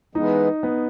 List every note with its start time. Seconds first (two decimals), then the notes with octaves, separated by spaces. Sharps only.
0.15 E3 G#3 B3 D#4
0.63 B3